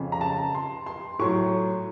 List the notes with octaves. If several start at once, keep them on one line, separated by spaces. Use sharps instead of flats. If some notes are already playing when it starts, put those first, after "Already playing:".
Already playing: F2 C#3 F3
A#5
A5
C6
C6
A2 F#3 C#6